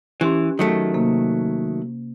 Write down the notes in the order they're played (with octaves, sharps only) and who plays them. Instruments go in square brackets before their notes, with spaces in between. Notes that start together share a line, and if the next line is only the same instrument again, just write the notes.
[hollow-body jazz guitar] E3 [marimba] C#4 G4 C6
[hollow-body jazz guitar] D#3 F#3 A3
[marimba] C3 A#3